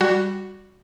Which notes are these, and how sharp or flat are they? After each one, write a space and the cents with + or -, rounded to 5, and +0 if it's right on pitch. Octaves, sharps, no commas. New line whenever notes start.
G3 +0 F#4 +0